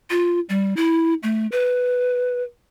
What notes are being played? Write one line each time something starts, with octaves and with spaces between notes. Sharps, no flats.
F4
G3
E4
A3
B4